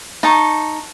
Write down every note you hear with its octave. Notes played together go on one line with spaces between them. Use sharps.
D#4 A5 C#6